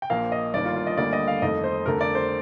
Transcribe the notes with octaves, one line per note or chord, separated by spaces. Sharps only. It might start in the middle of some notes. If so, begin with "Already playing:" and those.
G5
A#1 A#2 F3 A#3 F5
D#5
G1 G2 D#3 A#3 D5
F4
F4
D#5
D2 D3 G3 A#3 D5
D#5
F5
F2 D#3 A3 D#5
C5
F2 D3 A3 A#4
D5
C5